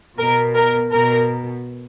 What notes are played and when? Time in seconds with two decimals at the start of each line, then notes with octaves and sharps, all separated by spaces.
0.19 B2 A#4
0.56 A#4
0.92 B2 A#4